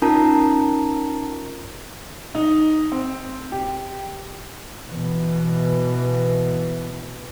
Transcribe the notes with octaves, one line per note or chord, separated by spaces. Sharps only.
C#4 D#4 F4 A#4 A5 A#5
D#4
C4
G4
B2 E3